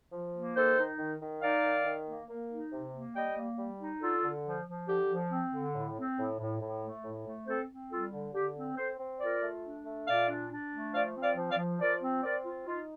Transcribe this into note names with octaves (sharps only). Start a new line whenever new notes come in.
F3
A#3
D#3 A4 C5
D#4
D#3
D#3
D#4 D5 F5
D#3
D#3
A#3
A#3
D#4
C3
A#3
G3 D#5 G5
A#3
G3
D#4
D3 F4 A4
D3
F3
F3
D3 G4
F3
C4
D3
A2
C4
A2
A2
A2
A3
A2
A3
C4 A4 C5
C4
G3 F4 A4
D3
D3 G4
C4
C4 A4 C5
C4
F4 A#4 D5
A3
D4
A3
A#2 D5 F5
D4
D4
A3
F3 D5 F5
C4
D5 F5
F3
D5 F5
F3
F3 A#4 D5
C4
C4 A#4 D5
F4
D#4 F4